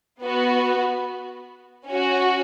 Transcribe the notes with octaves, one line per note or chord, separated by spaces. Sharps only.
B3 F#4
C#4
F#4